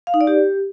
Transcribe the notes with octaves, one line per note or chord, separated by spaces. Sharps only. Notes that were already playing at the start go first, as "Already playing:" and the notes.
F5
D#4
D5
G4